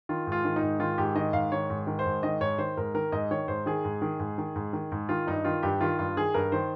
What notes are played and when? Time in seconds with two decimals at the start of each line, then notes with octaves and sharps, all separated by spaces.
0.09 D#3 F4
0.27 G#2 F4
0.45 D#3
0.56 D#4
0.62 G#2
0.80 D#3 F4
0.98 G#2 G4
1.16 D#3 D#5
1.33 G#2 F5
1.52 D#3 C#5
1.70 G#2
1.87 D#3
1.99 C5
2.06 G#2
2.23 D#3 D#5
2.40 G#2 C#5
2.58 D#3 C5
2.77 G#2 A#4
2.94 D#3 A#4
3.12 G#2 D#5
3.31 D#3 C#5
3.48 G#2 C5
3.66 D#3 G#4
3.85 G#2
4.02 D#3
4.20 G#2
4.38 D#3
4.56 G#2
4.73 D#3
4.92 G#2
5.09 D#3 F4
5.27 G2 D#4
5.45 D#3 F4
5.63 G2 G4
5.81 D#3 F4
5.99 G2 F4
6.17 D#3 G#4
6.34 G2 A#4
6.52 D#3 C5